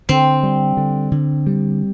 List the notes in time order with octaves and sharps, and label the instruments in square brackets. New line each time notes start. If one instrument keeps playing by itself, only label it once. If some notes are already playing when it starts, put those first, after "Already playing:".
[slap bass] D3 [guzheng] C4
[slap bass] G3
D3
D3
G3